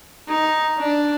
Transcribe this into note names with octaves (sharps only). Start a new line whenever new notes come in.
D#4
D4